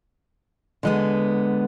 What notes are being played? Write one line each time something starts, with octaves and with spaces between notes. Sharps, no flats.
D3 G#3 B3